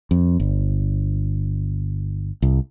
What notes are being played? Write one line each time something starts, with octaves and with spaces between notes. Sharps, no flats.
F2
G1
C2